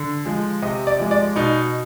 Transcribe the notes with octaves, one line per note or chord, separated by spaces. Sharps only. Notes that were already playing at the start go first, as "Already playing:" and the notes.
Already playing: D3
F3 G#3
C3 D#5
D5
F3 G#3
D5
B2 D#4